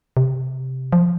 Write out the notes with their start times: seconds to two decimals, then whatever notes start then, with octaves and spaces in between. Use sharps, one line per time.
0.17 C3
0.92 F3